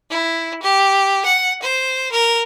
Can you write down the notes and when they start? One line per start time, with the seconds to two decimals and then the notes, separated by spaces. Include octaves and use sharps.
0.10 E4
0.62 G4
1.25 F#5
1.62 C5
2.12 A#4